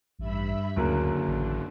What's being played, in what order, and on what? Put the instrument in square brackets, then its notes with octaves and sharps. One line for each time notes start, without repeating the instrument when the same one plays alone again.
[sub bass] A1 [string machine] G2 E5 B5
[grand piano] F#1 F#3 A#3 [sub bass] D2 [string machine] D3
[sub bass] A1